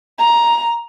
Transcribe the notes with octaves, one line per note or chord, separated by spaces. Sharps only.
A#5